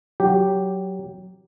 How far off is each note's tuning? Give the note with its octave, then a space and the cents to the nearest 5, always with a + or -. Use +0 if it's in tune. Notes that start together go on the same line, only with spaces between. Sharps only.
F#3 +10 G4 +0